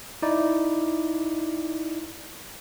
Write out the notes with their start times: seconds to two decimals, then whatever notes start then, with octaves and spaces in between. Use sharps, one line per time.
0.22 D#4 E4 D5